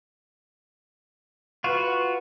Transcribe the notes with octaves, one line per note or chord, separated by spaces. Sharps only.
F4 F#4 B4